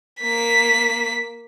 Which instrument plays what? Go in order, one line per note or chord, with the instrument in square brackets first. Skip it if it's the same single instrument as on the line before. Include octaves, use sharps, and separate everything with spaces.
[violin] A#3 B6